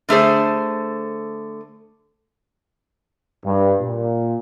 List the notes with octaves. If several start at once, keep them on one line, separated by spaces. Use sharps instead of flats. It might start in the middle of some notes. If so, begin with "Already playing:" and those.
D3 A3 G#4 C5
G2
A#2